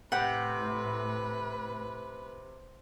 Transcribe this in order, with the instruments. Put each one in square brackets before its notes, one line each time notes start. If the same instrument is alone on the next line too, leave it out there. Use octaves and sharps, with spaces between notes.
[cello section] A2 [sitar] C3 [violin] B4 [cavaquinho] F#5 G5 B5